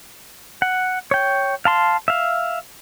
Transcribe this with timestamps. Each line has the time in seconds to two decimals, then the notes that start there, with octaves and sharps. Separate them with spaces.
0.62 F#5
1.11 C#5 G5
1.65 F5 A5 C6
2.08 E5 F5